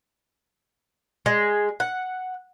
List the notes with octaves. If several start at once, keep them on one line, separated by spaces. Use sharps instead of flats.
G#3
F#5